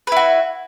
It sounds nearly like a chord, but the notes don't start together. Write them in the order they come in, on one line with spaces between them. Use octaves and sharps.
B4 E4 F#4